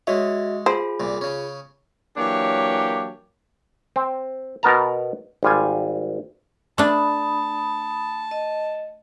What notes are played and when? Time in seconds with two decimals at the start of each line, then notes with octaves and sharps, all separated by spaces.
0.07 G#3 F#4 C#5 D#5 E5
0.66 F4 G#4 C5 B5
1.00 C2 A#2
1.21 C#3 C#4
2.17 E3 F#3 A#3 D4 G4 C#5
3.96 C4
4.63 B2 B3 A#4 A5 A#5
5.43 G#1 G3 F4 G#5
6.78 A3 D4 A5 B5 D#6
8.31 D#5